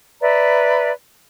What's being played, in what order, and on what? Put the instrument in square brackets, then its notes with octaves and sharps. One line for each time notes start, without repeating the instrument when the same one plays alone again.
[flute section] B4 D5 E5 A#5